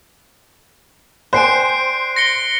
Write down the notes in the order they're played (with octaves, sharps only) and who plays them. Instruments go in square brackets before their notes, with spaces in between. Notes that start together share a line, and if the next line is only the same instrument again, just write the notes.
[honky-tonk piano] C5 [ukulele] D5 G5 G#5 [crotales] F#6 C7 D7
[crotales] A#6 C#7 G7